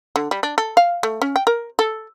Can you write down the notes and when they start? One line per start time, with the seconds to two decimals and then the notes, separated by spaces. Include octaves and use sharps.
0.16 D3
0.31 G3
0.43 D4
0.58 A4
0.77 F5
1.03 A3
1.22 C#4
1.36 G5
1.47 A#4
1.79 A4